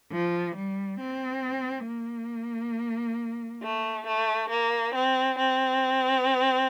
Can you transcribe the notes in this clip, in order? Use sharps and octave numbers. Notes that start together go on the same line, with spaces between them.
F3
G3
C4
A#3
A3
A3
A#3
C4
C4